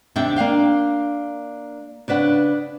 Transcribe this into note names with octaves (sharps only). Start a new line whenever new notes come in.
D#2 C3 D4 D5 E5 G5
A#3 D4 F5 G5
C#3 D4 B4 F#5